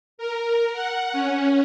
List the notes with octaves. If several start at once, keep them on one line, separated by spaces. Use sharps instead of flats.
A#4
F#5
C#4